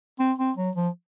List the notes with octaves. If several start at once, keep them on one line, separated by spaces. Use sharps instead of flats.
C4
C4
F#3
F3